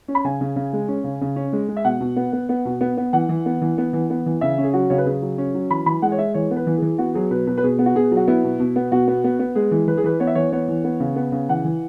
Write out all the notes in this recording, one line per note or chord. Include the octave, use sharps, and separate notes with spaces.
C#4
B5
C#3 G#5
C#3
C#3
G#3
C#4
C#3
C#3
C#4
G#3
G#3
E5
B2 F#5
B2
B3
B3
B3
B2
B3
B3
E3 F#5
E3
B3
E3
B3
E3
B3
E3
C#3 E5
C#4
G#4
F#3 F#4
C#3 C#5
B4
C#3 G#4
F#3
C#4
F#3
E3 B5
E3 B5
G#3 F#5
C#5
G#3 E5
E3 C#5
B3
B4
E3
E3 G#4
B3 F#4
F#3 G#4
B2 B4
B2 B4
B4
B2 G#4
B3
F#4
B2 G#4
F#3
F#4
B3 E4
B2
B2
B3
B2 F#4
B3
B3
B3
G#3 G#4
E3
E3 B4
G#4
E3 B4
B3 C#5
E5
E3 C#5
B3 C#5
E3
B3
C#3
B3
C#3
E3 F#5
E3